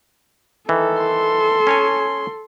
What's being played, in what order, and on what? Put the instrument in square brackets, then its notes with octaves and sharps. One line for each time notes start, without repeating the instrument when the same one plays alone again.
[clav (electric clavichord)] D#3 E3 [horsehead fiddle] A4
[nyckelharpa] C6
[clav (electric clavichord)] C#4 C#5 G#5